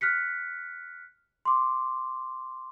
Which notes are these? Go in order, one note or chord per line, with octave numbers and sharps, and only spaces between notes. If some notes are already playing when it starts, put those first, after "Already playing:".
F6 F#6 B6 C#7
C6 D6